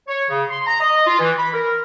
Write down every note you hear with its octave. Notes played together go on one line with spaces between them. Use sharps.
C#5
C#3
C6
A#5
D#5
F4
E3
B5
A#4